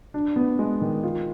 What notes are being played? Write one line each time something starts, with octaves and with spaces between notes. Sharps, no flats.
D4
B3
G#3
D#3
F4